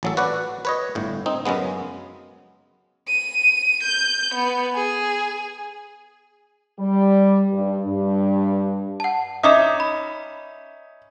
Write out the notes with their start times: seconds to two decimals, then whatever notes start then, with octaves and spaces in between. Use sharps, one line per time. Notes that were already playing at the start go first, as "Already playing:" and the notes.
0.03 A1 F#3 A4
0.17 F#4 B4 D5 F#5
0.65 B4 C#5 D#5
0.95 G1 A2
1.26 C4 D#4
1.45 F#2 C#3 G#3 B3
3.08 D#7
3.83 G6
4.34 B3
4.75 G#4
6.78 G3
7.52 G2
7.86 G2
9.00 F#5 A5
9.43 C#4 D#4 D#5 E5 D6 D#6
9.80 B5